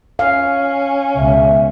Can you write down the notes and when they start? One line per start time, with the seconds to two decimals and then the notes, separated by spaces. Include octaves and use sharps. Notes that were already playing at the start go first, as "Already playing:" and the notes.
0.19 C#4 F5
1.16 C#2 B2 E5